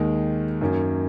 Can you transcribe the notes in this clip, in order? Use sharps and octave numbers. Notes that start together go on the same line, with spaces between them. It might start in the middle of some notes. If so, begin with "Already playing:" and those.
Already playing: D#2 D#3 G#3
F#2 D#3 A#3 C#4